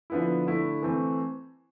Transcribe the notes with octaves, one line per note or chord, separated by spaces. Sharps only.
D3 F3 B3 E4
D3 A3 E4
E3 A3 C4